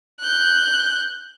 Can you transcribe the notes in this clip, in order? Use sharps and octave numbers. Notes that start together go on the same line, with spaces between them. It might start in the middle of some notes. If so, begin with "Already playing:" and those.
F#6 G6